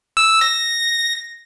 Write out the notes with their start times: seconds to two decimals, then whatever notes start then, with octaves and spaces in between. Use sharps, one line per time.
0.17 E6
0.41 A#6